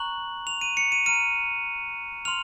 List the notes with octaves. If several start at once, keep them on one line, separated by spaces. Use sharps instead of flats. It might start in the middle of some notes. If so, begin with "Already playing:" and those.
Already playing: A#5 C#6 F#6 F#7
F7
D#7
C#7
D#7
A#5 F6 D#7
C6 F6 F7